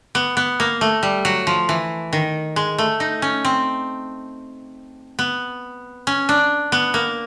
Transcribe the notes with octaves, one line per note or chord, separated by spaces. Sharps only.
B3
B3
A#3
A3
G3
F#3
F3
E3
D#3
G#3
A3
D#4
C#4
C4
B3
C#4
D4
B3
A#3